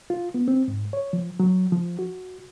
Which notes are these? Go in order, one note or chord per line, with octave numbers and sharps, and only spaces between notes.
F4
B3
C4
G#2
C#5
F3
F#3
F3
F#4